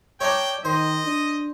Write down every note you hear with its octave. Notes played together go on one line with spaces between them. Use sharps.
D4 D#4 C#5 G5
D#3 C5 D#5
D4